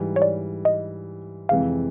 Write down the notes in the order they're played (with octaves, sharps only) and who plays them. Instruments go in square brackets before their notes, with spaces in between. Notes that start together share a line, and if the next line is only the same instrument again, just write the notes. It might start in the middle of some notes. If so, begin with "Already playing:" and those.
Already playing: [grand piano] G#2 E3 G3
[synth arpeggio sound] C#5
D5
D#5
[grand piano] F2 C3 E3 G#3 [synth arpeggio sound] F5